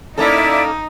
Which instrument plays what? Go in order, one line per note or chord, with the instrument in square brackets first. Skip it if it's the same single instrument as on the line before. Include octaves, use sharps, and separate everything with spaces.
[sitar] A#3 C#4 A4 [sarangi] D#4 [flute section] E4 D5